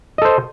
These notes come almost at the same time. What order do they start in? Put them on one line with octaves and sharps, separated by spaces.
D#5 A4 C5